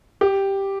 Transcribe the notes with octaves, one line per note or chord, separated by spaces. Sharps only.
G4